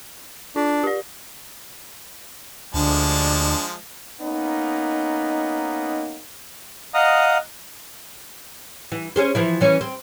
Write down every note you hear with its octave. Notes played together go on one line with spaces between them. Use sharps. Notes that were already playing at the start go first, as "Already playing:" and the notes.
D4 F4
G4 D5
D2 F3 G#3 D4 A5
A#3 B3 C#4 D#4
D#5 F5 F#5 A#5 D#6
E3
C#4 G#4 C5
E3 F3 E4
E3 C#4
C4